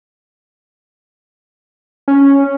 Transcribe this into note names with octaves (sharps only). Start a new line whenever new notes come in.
C#4